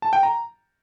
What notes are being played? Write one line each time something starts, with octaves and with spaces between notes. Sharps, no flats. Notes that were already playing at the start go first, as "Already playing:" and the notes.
A5
G5
A#5